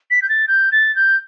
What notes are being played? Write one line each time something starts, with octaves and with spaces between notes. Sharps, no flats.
B6
G6
A6
G6
A6
G6